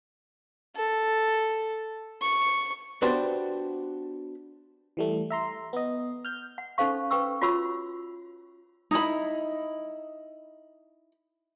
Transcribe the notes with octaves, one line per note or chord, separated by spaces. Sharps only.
A4
C#6
B3 D4 F#4 G4 B4 C5
E3 G3 A3
E5 A#5 C6
B3 D#5
F6 G6
F#5
C#4 D#4 A4 C5 F5 C#6
B4 G5 C#6 E6
F4 F#4 C#5 B5 C#6 E6
D#4 E4 B5